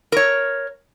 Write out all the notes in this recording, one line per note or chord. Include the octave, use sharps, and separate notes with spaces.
A#4 C#5